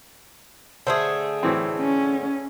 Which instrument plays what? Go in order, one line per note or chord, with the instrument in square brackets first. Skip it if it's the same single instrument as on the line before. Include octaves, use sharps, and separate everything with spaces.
[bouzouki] D3 A3 G#4 [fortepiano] C5
[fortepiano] A2 E3 C4
[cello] C#4